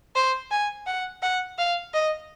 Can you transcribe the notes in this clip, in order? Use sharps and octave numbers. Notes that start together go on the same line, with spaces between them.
C5
G#5
F#5
F#5
F5
D#5